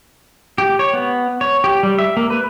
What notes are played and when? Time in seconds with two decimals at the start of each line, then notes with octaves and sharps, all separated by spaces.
0.58 G4
0.79 C#5
0.94 B3
1.41 C#5
1.64 G4
1.83 G3
1.99 E5
2.17 A#3
2.30 B4